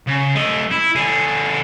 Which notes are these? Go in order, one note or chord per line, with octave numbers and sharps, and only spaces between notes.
C#3
A3 D#5
E4
D3 G#4